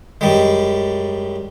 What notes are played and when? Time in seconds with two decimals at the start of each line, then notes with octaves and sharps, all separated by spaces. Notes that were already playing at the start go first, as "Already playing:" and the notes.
0.21 F#2 G3 G#3